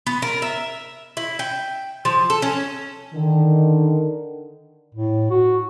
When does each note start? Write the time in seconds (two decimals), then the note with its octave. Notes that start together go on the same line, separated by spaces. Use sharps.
0.07 B3
0.22 A#4
0.42 E5
1.17 E4
1.39 G5
2.05 F3
2.30 A4
2.42 C#4
3.14 D3 D#3
4.95 A2
5.30 F#4